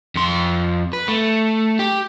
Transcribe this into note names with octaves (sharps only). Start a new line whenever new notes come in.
F2 C6
B4
A3
G4